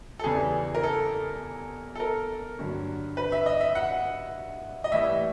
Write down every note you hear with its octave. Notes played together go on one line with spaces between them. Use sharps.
A4
E2 C#3 E3 G3 G#4
A#4
A4
A4
A#4
G2 D3 F#3
B4
E5
D#5
E5
F#5
D#5
A2 E3 G3 E5